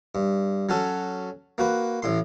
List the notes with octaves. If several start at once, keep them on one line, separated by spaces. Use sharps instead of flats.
G2
F#3 C#4 F#4 A4
A#3 F#4 B4
A1 A2 C6